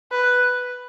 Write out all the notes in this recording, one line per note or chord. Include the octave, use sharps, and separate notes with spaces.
B4